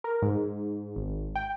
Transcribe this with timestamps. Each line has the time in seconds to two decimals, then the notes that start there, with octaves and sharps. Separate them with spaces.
0.04 A#4
0.22 G#2
0.96 G#1
1.36 G5